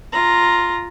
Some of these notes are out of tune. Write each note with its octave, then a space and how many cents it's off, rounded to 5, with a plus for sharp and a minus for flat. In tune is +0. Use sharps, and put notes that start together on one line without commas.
F4 +0 A#5 +0